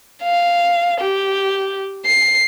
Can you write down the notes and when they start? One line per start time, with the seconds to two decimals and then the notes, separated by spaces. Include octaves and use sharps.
0.23 F5
1.00 G4
2.06 C7